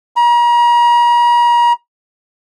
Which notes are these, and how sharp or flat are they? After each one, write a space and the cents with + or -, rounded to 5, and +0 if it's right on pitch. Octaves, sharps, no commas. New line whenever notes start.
A#5 +40